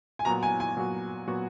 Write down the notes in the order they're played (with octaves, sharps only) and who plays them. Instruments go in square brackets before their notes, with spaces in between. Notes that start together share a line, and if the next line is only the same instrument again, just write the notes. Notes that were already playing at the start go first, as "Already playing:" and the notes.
[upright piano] G#5
[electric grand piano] A#2 F#3 B3 F#4 [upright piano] A#5
[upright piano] G#5
G#5
[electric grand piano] A#2 F#3 B3 F#4
A#2 F#3 B3 F#4